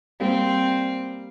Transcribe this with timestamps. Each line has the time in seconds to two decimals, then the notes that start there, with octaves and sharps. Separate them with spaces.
0.20 G3 A#3 C4